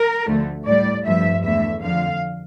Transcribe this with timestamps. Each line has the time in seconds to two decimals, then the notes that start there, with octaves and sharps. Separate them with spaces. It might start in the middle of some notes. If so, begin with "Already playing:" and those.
Already playing: A#4
0.27 D2 D3 F3 A3
0.67 A2 G3 D5
1.05 G2 F3 A3 E5
1.44 E2 D3 A3 E5
1.84 F2 D3 F3 F5